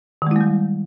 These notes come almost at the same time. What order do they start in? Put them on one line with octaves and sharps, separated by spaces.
D#3 G#3 E4 A#3 G3